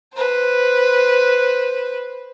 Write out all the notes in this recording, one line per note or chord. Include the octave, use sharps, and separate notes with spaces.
B4 C5